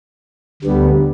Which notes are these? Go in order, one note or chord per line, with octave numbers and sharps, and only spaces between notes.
D2 D3 G3 B3